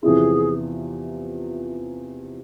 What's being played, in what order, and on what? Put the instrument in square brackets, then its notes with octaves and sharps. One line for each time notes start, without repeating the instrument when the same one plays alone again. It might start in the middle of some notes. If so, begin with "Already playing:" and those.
[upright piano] E2 C3 F3 C4 E4 [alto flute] G#4